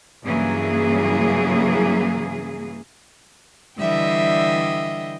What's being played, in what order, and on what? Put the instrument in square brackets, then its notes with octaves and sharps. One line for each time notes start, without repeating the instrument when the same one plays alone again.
[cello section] G2 C#3 E3 F#3 A#3 G#4
[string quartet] D3 E3 G3 D#5 E5 G5